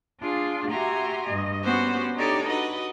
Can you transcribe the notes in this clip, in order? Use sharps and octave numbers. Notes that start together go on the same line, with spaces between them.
D4 F4 G#4
F#4 G4 E5 G#5 A#5 C6
G2 D#5
B3 C#4 F#4 G4 C5
D4 D#4 G4 A4 C#5 D5
F#4 B4 D#5